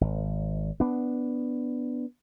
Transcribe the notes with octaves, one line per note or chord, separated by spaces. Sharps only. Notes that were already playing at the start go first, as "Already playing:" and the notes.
G#1
B3 D4